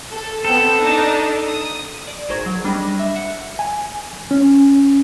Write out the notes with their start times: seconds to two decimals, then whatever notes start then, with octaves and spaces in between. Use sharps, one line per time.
0.10 A4
0.45 B3 C4 A4 G6
0.81 D4 D#4
1.45 D#6
2.07 D5
2.29 G#1 G#4 A#4 C5 C#6 G#6
2.46 F#3
2.64 G3 D4 D#5 B5 D6 A#6
2.99 E5
3.16 E5 F#5 C#7
3.59 G#5
4.31 C#4